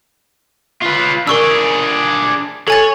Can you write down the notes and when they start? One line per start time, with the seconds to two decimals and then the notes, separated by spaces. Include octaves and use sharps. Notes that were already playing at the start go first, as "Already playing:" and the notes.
0.82 F4 B4
1.27 D4 G#4 A#4 C#6 E6
2.68 A4 C#5 G#5 A6